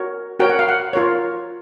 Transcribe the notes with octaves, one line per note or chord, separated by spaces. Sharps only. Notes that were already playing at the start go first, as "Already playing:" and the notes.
Already playing: F#4 A#4 C#5
F#4 A#4 C#5 G5
F#5
F5
F#5
F4 A#4 C#5